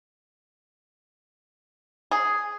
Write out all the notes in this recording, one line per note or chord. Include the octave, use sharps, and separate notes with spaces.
G#4